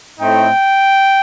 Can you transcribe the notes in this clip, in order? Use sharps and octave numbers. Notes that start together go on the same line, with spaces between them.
A2 A3 C4 D#4 G5